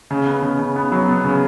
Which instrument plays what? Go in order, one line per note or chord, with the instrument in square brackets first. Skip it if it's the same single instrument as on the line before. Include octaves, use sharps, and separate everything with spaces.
[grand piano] C#3
B3
C#3
C#3
B3
F#3
B3
C#3